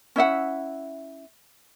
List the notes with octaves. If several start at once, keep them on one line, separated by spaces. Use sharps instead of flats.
C#4 E4 E5 F#5